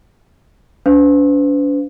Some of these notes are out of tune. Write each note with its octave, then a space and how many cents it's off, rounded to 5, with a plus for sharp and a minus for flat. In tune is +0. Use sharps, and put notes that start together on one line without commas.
D4 -45 B4 +40 F5 +0